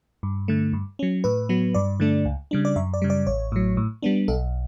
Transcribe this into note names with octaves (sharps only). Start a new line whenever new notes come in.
G2
D3 A3
G2
F#3 C#4
A2 B4
F#3 B3
G2 D5
D3 A3 D4
C#2
C#3 G3 D4
D5
F#2 E5
D5
C#3 G3
D5
A1 C#5
A2 F#3
A2
G3 B3 D4
B1 A4